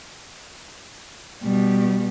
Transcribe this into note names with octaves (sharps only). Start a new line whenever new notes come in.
B2 G3